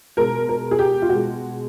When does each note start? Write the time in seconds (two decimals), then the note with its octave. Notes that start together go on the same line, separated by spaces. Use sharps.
0.17 B2 G#3 A#4
0.49 A#4
0.71 G#4
0.79 G4
1.02 F4
1.09 B2 F#4
1.14 G#3